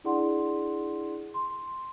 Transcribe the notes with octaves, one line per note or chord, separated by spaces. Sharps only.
D4 E4 G#4 D5 F#5 C6
C6